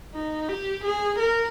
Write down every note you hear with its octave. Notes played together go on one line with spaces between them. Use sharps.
D#4
G4
G#4
A#4